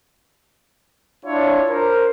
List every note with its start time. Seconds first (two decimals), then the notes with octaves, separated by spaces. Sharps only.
1.24 D4 E4 F4 C#5
1.68 A#4 C5